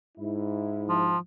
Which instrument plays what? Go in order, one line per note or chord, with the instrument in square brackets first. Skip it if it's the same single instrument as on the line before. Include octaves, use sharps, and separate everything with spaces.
[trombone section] G#2 E4
[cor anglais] F3